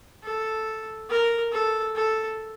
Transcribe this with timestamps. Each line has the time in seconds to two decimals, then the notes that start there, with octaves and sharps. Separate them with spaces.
0.24 A4
1.10 A#4
1.52 A4
1.95 A4